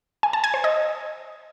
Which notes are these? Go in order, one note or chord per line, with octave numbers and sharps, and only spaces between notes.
G#5
A5
G#5
C5
D#5